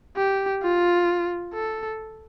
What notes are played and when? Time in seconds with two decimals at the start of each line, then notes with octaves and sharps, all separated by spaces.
0.17 G4
0.62 F4
1.54 A4